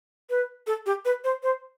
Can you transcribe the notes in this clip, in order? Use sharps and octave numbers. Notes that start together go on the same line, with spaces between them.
B4
A4
G4
B4
C5
C5